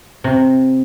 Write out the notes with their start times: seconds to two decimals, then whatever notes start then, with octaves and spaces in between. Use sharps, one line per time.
0.24 C3